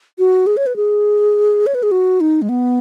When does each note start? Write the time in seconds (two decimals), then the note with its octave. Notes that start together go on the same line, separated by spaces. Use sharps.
0.19 F#4
0.47 G#4
0.57 C#5
0.66 B4
0.76 G#4
1.66 C#5
1.75 B4
1.83 G#4
1.91 F#4
2.21 D#4
2.42 G#3
2.49 B3